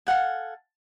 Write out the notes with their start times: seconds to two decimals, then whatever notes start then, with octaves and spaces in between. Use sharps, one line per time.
0.07 A4 F5 F#5 G#5